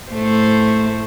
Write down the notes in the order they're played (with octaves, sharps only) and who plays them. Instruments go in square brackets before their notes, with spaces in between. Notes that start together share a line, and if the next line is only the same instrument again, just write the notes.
[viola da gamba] A2 A3 C5